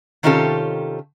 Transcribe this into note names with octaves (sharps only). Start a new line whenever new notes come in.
C3 D#3 C#4 F4 G4 A4